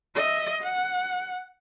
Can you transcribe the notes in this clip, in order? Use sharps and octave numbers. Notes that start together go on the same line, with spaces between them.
D#5 E5
F#5